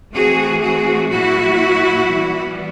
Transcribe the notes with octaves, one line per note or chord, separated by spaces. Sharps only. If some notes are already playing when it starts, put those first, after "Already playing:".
E3 A3 C4 F#4 G#4
F#4 G#4
A#2 F#3 A#3 E4 F#4
E3 G3 B3